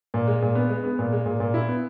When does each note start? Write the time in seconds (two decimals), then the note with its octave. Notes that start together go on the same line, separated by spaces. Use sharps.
0.14 A#2
0.27 G#3
0.42 A#2
0.55 B3
0.69 G#3
0.84 B3
0.99 A#2
1.13 G#3
1.26 A#2
1.40 A#2
1.54 E4
1.69 B3